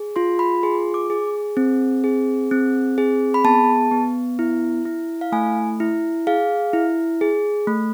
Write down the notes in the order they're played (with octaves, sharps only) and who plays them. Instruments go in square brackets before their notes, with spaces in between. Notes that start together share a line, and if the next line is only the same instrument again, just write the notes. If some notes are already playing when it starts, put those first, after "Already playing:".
Already playing: [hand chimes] G#4
F4 C6
B5
G#4 C6
D6
G#4
C4
G#4
C4
G#4
B5
B3 A5
B3
E4
E4
F5
A3 G#5
E4
G#4 F5
E4
G#4
A3